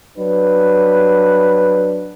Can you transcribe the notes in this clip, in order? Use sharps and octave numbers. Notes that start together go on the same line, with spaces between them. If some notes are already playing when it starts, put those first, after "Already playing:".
F#3 D4 B4